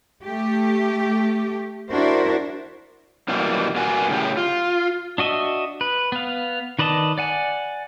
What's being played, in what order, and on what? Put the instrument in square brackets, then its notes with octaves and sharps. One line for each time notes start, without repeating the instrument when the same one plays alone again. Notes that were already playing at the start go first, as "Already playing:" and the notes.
[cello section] A3 G4
D4 E4 F#4 A#4 C5
[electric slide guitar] F#2 B2 E3 G3 A#3
A#2 A#3 B3 F#4 G#5
A2 C#3 G4
F4
[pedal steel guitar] D4 F#4 D#5 E5
B4
B3 F5
D#3 B4 D5 D#5 A5
D5 F#5 G#5